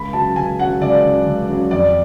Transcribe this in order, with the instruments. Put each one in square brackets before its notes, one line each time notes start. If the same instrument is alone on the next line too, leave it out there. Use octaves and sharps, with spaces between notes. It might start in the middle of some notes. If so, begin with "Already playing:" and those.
Already playing: [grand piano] C#2 B5
F#3 A5
C#3
C#2 G#5
C#3 F#3 F#5
C#2 D5
C#3 F#3
C#2
C#3 F#3
F2 D5